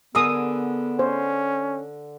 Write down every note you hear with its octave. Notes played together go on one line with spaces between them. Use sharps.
D3 B3 G#4 A#4 D#6 E6
C#4 C5